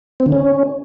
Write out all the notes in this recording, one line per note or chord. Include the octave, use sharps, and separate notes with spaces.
C4
D3
C#4